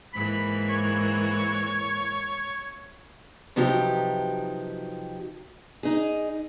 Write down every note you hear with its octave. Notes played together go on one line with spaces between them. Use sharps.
G#2 E3 A#3 B5
C#5
C3 F3 F#3 D#4 G4 B4
D#4 G#4